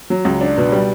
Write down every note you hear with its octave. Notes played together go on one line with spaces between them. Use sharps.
F#3
C#2
D4
B2
G3